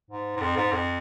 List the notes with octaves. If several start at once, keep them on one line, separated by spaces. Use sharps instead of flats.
G#2
G#2
F2
G#2
F2